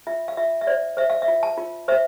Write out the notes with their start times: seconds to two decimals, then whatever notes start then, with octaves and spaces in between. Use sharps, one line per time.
0.07 F4 E5
0.28 F5
0.37 F4 E5
0.61 E5
0.67 C5 D5
0.97 C5 E5
1.10 F5
1.22 E5
1.28 F4
1.43 A5
1.58 F4
1.88 C5 E5